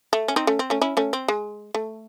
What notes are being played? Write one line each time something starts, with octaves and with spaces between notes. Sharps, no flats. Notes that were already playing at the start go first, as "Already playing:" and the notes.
A3
C#4
C4 D#4
A3 C#4
C4
A3 C#4
C#4 E4
A3 C#4
C4
G#3
A3